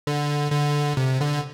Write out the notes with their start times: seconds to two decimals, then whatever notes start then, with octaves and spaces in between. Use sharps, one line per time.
0.07 D3
0.52 D3
0.97 C3
1.21 D3